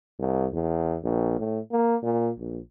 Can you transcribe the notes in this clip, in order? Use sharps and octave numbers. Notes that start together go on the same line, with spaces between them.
C2
E2
A#1
A2
A#3
A#2
A#1